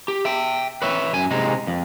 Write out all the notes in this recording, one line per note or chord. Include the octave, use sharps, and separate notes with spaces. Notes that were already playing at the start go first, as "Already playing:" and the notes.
G4
E5 G5
B4 C#5 E5
F#2 G#5
C3 G#3 D#4
F2